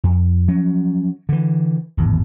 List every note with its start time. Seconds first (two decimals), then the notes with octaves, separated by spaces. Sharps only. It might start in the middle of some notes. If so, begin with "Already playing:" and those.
0.04 F2
0.48 F3 F#3 C#4
1.29 D3 E3
1.97 D1 G#1 E2